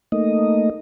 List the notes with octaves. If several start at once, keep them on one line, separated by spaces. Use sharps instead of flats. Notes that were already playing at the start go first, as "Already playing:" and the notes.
A3 A#3 D#4 D#5